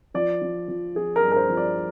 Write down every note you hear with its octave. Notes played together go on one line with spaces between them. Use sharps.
F3 D5
F3
F3
F3 G#4
A#4
G2
A#4
C5
F3
D5